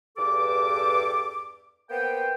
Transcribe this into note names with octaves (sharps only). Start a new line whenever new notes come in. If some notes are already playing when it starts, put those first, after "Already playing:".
E2 G2 A4 D6
A#3 B3 C5 G5